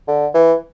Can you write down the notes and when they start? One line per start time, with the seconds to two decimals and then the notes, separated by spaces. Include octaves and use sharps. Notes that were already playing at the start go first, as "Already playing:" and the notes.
0.08 D3
0.35 E3